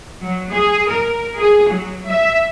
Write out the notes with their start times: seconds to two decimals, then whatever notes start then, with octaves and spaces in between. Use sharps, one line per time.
0.21 F#3
0.51 G#4
0.87 A#4
1.38 G#4
1.68 F#3
2.06 E5